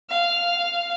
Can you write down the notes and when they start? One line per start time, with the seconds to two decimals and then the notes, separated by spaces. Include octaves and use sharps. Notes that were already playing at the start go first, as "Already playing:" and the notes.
0.10 F5